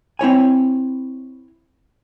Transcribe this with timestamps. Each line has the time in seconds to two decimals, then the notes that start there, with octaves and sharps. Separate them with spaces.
0.19 C4 E4 C#5 G#5